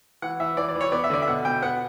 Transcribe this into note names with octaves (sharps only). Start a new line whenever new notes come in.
E3 F#5
E3 E5
E3 D5
D5
E3
C#5
B3 D5
E5
D3 D5
E5
B2 F#5
B2 G5
B3 F#5